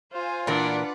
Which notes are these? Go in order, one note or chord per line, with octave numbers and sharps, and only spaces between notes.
F4 C5 F5 G#5
A#2 E3 D4 A#4 B4 D5 F#5